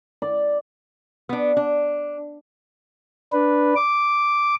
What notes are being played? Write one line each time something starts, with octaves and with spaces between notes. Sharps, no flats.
D5
B3 D4
D4
D4 B4
D6